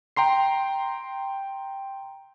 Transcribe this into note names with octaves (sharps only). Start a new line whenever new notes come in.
G5 A#5 C6 C7